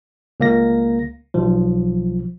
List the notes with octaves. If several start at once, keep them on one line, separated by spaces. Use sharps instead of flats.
C#2 A#3 A#6
B1 F3